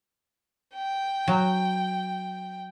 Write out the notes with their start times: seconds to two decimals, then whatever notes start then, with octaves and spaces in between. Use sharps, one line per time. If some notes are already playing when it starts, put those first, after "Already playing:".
0.75 G5
1.28 F#3